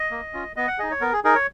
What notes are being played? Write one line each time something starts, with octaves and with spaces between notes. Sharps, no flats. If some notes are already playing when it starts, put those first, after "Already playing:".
Already playing: D#5
A#3
C#4 F4
B3 D#5
F#5
D#4 G#4 D#5
C#5
B3 A#4
G#4
D#4 G#4 A#4
C#5